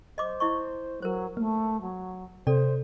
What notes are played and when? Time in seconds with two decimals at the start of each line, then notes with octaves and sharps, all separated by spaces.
0.18 C5 D#5 D6
0.40 E4 D#5 C#6
1.02 F#3 A#4 C5
1.37 A3 A#3
1.82 F#3
2.47 C3 A4 C5 D5